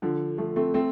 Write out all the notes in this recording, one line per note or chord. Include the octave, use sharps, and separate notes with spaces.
D3 F3
F3 A3
A3 C4
A3 C4